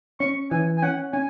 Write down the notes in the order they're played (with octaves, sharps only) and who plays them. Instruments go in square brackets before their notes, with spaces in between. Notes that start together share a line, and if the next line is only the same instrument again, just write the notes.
[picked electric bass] C#4 [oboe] C#6
[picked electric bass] E3 [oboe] G#5
[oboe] G#5
[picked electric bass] C#4 [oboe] F#5
[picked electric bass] C#4 [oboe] G#5